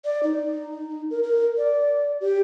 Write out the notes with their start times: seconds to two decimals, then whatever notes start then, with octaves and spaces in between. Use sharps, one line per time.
0.05 D5
0.23 D#4
1.10 A#4
1.23 A#4
1.57 D5
2.21 G4